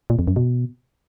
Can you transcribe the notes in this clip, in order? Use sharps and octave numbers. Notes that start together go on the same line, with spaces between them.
A#2
F2
F#2
B2